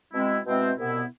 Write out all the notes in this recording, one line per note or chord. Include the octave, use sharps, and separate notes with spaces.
B2 G#3 C4 E4
B2 G#3 C4 E4
C2 B2 B3 E4